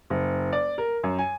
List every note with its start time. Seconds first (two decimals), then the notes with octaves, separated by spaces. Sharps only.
0.10 F#1
0.53 D5
0.78 A#4
1.03 F#2
1.19 G#5